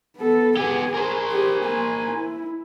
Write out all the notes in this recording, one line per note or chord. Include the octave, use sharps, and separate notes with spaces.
B3 A4
B3 G4 G#4 G#5
A#4 C5
G4 G#4
A#3 G#5
E4